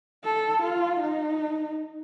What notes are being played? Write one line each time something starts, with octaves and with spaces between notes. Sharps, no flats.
A4
F4
D#4